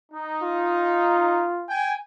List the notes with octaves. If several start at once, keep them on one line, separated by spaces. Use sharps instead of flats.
D#4
F4
G5 G#5